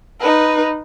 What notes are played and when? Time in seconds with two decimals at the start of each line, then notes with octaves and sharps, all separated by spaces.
0.21 D#4 B4